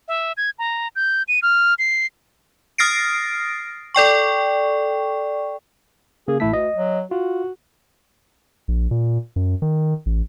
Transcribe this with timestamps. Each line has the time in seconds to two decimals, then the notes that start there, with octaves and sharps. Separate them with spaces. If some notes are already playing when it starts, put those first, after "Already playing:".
0.08 E5
0.37 G#6
0.59 A#5
0.96 G6
1.28 D#7
1.42 F6
1.79 C7
2.78 D#6 F6 A6 A#6 C7 D7
3.95 A4 D5 G5 C#6
6.28 C#3 A#3 G#4
6.40 A1 A3 E4 B6
6.53 D2 D#5
6.76 F#3
7.11 F4 F#4
8.68 A#1
8.91 A#2
9.36 F#2
9.62 D#3
10.06 A1